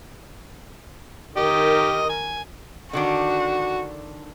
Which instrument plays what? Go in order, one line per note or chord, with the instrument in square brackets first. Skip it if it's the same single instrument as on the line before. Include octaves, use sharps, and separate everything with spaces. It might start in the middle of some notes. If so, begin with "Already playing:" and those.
[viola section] D#3 A#4 [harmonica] G4 D#5
[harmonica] G#5
[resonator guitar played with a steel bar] D3 D#3 D4 [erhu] F#4